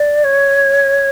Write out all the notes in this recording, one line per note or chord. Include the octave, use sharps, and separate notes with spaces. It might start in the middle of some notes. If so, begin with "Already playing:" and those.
Already playing: D5
C#5